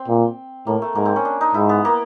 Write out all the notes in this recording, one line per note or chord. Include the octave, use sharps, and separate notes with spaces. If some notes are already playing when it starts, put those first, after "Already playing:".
Already playing: C4
A#2
A2 A#3
A3
G#2 A#3
C4
C#4
D4
D#4
G#2 E4
B3
A#3